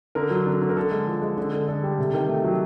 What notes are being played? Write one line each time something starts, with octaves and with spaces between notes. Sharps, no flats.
D3 A#4
F#3
D3
D3
A#4
D3 A4
G#3
F3
G#3
D3
D3
D3 A4
G3
C3
D#3
A3
F#3